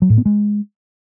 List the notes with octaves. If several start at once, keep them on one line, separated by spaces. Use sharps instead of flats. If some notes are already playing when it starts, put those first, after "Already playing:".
F#3
A2
B3
G#3